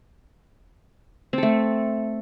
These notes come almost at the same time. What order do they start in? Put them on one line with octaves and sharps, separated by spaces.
C4 A4 A3